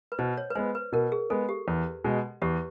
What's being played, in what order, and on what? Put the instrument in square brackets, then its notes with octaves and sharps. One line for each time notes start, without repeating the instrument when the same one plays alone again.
[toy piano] B4
[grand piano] B2 [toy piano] C5
[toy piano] C#5
B4
[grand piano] G#3 [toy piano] C5
[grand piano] B3
[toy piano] B4
[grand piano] B2 [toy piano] A#4
[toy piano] G#4
[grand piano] G#3 B3 [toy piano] A4
[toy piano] G4
[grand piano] E2
B2 G#3
[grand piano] E2 [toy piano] G4